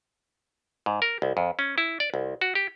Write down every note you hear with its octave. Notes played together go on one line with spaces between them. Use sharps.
G#2
A#4
C2
F2
C#4
E4
D5
C2
F#4
G4